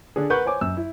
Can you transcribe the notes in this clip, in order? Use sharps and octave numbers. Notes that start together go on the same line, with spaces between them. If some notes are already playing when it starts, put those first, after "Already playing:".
D3 D4 G#4
A#4 B4 F#5 C#6 G6
C5 C#5 G#5 D6
F#2 E6
E4